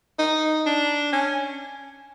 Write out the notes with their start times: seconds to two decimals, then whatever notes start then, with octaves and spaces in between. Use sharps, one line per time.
0.19 D#4
0.66 D4
1.13 C#4